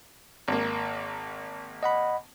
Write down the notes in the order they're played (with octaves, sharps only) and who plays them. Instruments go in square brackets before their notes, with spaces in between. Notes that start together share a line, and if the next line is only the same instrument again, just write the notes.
[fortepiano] G#1 A#3
[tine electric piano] D#5 F#5 B5